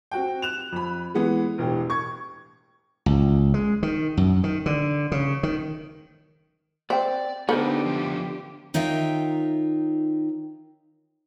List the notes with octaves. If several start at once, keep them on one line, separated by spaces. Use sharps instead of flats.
C4 F#4 G5
F#6 E7 F7
F2 B5
E3 G#3 B3
E1 A2 G4
C#6 G#6
C#2
G#3
D#3
F#2
D#3
D3
C#3
D#3
C4 D5 E5 G5
D3 B3 D4 D#4 G4 A4 A#4 C5
F3 A3
D#3 D#4 F4 C#5 E5 G5